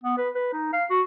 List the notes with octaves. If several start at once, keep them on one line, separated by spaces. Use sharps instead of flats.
B3
B4
B4
D#4
F5
F#4